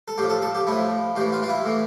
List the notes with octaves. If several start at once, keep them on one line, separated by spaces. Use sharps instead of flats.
A4
A2 F3 G4
A4
A4
G4
A2 F3 E4
A2 E3 G4
F4
F4
E4
A2 E3